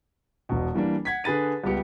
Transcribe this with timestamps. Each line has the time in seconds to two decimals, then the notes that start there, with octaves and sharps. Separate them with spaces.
0.49 E1 B2
0.74 E3 G3 A#3 D4
1.05 F#5 G#6 B6
1.24 D3 G#4 B4 A6 D#7
1.63 C#2 G3 B3 G4 C#7